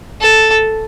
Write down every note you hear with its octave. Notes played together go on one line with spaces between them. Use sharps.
A4